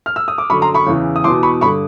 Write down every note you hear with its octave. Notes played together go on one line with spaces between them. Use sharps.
F6
E6
D#6
D6
F#2 D3 B5 C#6
A#5 C6
B5 C#6
E2 C#3 E3
D#6
E2 B2 C6 D6
B5 C#6
G2 D3 B5 C#6